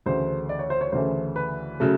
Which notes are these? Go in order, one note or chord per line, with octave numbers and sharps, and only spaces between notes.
D2 C#3 E3 A3 C5
D5
C#5
C5
C#5
D2 C#3 E3 A3 C5
B4
C#3 F#3 A3